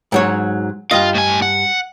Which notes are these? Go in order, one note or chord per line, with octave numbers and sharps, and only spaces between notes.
G#2 F#3 C#5
G2 F4 D#5 F5
A2 G#5
F#5